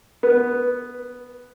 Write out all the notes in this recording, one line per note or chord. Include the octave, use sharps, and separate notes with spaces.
B3